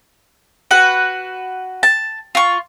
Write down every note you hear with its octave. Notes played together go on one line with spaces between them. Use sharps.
F#4 B4 F#5
A5
F4 C#6